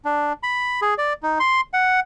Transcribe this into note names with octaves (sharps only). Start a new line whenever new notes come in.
D4
B5
G#4
D5
D#4
C6
F#5